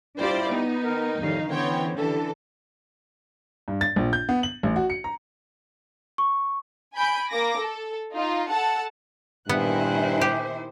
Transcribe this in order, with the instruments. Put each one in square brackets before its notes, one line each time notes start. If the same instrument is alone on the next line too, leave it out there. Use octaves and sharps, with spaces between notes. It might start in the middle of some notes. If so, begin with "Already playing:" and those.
[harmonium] G3 E4 [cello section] D4 F4 G4 [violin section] C5 D5
[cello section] B3 [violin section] D#4
[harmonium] D#3 A#4
[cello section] F2 D#3 F5 [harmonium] A2 G3
[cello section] D3 E3 C#4 [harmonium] B3 C5 [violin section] C#5 G5
[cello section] D3 E3 [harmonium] G3 [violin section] A4
[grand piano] G2
A6
A#1
G6
B3
F#7
A1
F#4
C#7
A#5
[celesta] C#6
[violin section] G#5 B5 G6 D7
A#3 D6 A#6
A4
D#4 F4
A4 F#5 A5
[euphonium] G2 [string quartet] A#2 G#5 F#6 [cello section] D#3 E4 C5 [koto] B3
[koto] G4